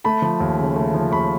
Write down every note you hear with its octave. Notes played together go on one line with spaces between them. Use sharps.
A3 A5 B5
F3
D#2
C#3
A3
F3
D#2 B5 C#6